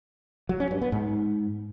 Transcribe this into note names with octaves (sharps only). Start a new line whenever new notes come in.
F#3
C#4
G2
B3
G#2